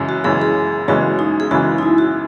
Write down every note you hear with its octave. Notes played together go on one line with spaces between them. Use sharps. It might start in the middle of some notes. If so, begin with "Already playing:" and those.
Already playing: F#2 C#3 E3 G#3 C#4
F#4
F#2 C#3 E3 G#3 C#4 G#4
G#4
F#2 C#3 E3 G#3 C#4 F#4
D#4
G#4
F#2 C#3 E3 G#3 C#4 F#4
D#4
E4
F#4